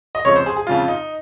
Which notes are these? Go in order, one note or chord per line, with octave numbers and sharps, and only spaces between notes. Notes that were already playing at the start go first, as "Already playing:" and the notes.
D#5
F2 C#3 F3 G#3 C#5
C5
G#4
G#4
F2 C#3 G#3 F4
D#4